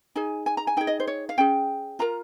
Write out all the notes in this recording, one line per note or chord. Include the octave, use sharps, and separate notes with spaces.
D#4 G#4 G#5
G#5
A#5
G#5
D#4 G#4 G5
D#5
C5
C#5
F5
C#4 G#4 G5
F4 A#4 A#5